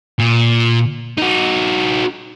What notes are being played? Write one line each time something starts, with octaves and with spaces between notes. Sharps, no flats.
A#2
D#4 F#4